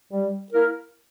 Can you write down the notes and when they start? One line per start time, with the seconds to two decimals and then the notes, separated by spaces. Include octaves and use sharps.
0.12 G3
0.51 A#3 E4 A#4